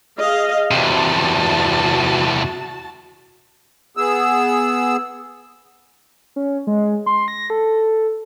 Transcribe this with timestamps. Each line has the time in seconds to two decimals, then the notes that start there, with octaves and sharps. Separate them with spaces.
0.18 G#4 D#5 F5
0.71 E2 C3 F#4 A5
3.97 B3 G#4 E6
6.36 C#4
6.67 G#3
7.06 C6
7.28 A#6
7.50 A4